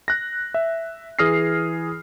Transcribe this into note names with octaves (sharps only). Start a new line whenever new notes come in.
F#6 A#6
E5
E3 G#4 D#6 F6 A#6 C7